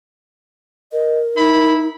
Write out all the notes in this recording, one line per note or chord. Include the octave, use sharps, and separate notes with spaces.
A#4 D#5
D#4 E4 B5